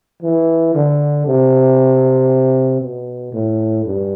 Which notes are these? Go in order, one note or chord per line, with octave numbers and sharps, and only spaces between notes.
E3
D3
C3
B2
A2
G2